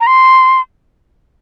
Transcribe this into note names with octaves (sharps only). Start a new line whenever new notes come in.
A#5
C6